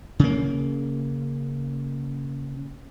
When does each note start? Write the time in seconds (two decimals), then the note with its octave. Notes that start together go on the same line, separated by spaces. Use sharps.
0.19 C#3 A#3